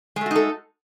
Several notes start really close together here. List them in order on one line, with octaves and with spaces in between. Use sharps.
G#3 A3 F#4 D#4 A4